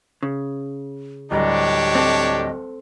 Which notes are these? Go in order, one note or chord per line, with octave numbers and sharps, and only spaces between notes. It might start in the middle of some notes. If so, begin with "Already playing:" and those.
C#3
D1 G3 D4 G4 C#5 D#5 A#5
C4 A4